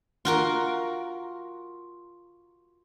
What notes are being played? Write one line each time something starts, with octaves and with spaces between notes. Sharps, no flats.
F4 F#4 A#4